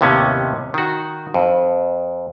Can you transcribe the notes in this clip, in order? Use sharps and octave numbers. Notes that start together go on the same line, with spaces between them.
D#2 A2 C3 B3 C#4
D#3 F#4
F2